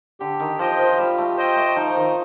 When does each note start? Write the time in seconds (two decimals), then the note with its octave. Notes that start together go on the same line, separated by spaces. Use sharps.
0.20 D3 G4
0.40 D#3
0.59 F3 C5 D#5 G5
0.79 F3
0.98 G3 G4
1.18 A3
1.37 C5 D#5 G5
1.56 A3
1.76 F3 D#4
1.96 D#3